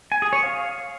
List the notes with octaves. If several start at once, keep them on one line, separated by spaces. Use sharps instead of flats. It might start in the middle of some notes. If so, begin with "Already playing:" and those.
G#5
G#4
C#5
F5